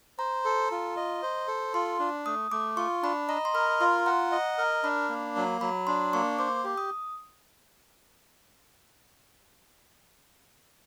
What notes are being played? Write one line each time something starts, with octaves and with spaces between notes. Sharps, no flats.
C5 A#5
A4
F4
D#5
C5
A4
F4 C6
D4
A3 D#6
A3 D6
F4 C#6
D4 B5
D#5 A#5
C6
A#4 B5
F4 C6
F#5 A#5
D#5
A#4
D4 B5
A#3
F#3
F#3 B5
D4 C6
A#3 C#6
C5 D6
G4
D#6